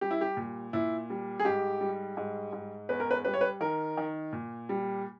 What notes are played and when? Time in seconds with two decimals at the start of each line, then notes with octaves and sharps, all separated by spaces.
0.01 G3 G4
0.11 E4
0.21 G4
0.37 A#2
0.73 A#2 E4
1.10 G3
1.39 G#4
1.45 G#2 G4
1.81 G3
2.17 G#2
2.53 G#2
2.89 E2 B4
3.00 A#4
3.11 B4
3.25 G3 B4
3.34 C#5
3.41 B4
3.61 D#3 A#4
3.97 D#3
4.33 A#2
4.69 G3